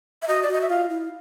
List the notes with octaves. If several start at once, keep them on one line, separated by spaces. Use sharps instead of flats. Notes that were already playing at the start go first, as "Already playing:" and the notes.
E5
F#4 D#5
D5
F#4 D#5
E5
F4 F5
E4